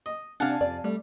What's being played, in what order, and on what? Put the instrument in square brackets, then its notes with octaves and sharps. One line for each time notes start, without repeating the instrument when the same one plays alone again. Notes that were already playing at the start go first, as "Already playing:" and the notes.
[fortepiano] D#5
[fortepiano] C3 F#5 [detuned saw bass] D4 [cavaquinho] F5 G#5 A5
[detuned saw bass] F2 [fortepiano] C3 [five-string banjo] D5
[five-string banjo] G3 [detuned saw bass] A3